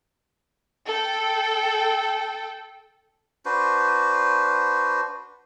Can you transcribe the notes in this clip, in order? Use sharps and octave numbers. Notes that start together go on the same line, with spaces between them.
A4 G5
D4 F#4 B4 C5